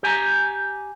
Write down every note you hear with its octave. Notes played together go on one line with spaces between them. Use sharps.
G4 G#5 A#5